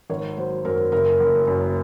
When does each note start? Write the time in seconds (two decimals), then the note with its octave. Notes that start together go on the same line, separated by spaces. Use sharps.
0.10 G#1 C#5
0.37 F#3 C5
0.65 F#2 A#4
0.92 F#1 A#4
1.20 F#1
1.47 F#2